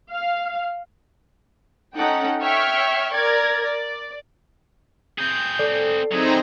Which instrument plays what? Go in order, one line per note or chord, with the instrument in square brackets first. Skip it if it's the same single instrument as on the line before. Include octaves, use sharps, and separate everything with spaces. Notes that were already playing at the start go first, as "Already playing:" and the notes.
[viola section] F5
[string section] C#4 D#4 A4 F#5 G5
C#5 E5 G5 C#6 F6
A#4 D5 G#6
D5
[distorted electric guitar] C4 G#4 [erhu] G6
[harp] A4 D5
[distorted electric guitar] F#3 E4 [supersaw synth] C4 D#4 A#5 [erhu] G#4